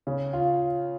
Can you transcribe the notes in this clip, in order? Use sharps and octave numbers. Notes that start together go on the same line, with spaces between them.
C#3
F4